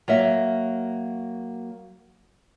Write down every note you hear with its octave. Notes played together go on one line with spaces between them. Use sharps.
F#3 A#3 E5